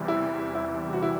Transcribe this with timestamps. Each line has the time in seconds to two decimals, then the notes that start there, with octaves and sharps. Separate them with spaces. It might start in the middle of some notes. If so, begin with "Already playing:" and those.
Already playing: E2 C3 E3 G3
0.08 E4
0.55 E4
0.93 F#4
1.02 E4